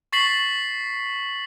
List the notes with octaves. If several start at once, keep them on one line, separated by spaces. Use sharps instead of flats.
C#6 A6 B6 C7 F#7